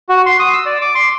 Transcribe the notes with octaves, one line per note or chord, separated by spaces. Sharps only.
F#4
C6
D#6
E6
D5
D6
C6